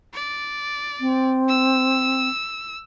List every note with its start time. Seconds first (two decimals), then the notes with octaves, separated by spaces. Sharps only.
0.14 D5
1.01 C4
1.48 E6